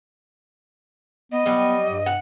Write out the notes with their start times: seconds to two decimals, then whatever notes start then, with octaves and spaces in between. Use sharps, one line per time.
1.32 B3 D#5
1.46 F#3 G3 B3
1.88 G2
2.06 F#5